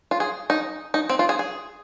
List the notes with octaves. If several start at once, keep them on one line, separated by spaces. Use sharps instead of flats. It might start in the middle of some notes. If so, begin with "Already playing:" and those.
F4
G#4
D#4
D#4
C4
F4
G#4
G#4